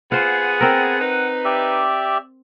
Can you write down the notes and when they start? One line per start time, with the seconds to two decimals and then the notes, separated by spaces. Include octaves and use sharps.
0.12 B3 F4 G#4 C5 F#5
0.61 C4 A#4
1.01 D#4 B4
1.45 G4 D5 E5